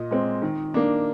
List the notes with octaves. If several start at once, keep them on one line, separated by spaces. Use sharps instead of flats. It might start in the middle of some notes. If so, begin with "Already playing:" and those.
Already playing: A#2 D#5
G#3 C4
D#3
A#3 D4